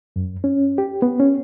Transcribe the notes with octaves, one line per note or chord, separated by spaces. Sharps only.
F#2
C#4
G4
B3
C#4